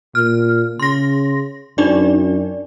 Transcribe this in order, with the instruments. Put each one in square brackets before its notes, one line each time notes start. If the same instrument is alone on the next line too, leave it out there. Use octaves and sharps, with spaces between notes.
[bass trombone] A#2 [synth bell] F6
[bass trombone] C#3 [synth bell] C6 A#6
[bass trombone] F#2 [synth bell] D4 D#4 D5